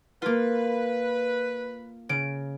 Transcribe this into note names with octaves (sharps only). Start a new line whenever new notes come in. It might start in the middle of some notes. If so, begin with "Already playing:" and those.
A#3 F4 B4
C#3 D7